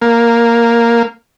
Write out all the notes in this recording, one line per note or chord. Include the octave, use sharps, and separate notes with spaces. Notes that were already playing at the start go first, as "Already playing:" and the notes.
A#3